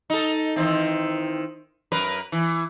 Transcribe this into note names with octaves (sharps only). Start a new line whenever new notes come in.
D#4 A4
D#3 E3 C4
F#2 A#4 B4
E3